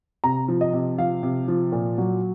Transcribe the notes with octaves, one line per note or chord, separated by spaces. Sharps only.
C3 A#5
F3
D#5
C3
F3 F5
C3
F3
A#2
F#3